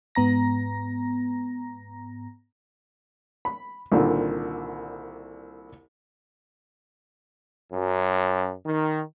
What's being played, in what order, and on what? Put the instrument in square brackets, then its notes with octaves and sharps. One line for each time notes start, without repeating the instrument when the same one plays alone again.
[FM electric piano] G#2 B3 A#5 A#6
[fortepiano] B5
C2 A#2 D3 D#3
[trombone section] F#2
D#3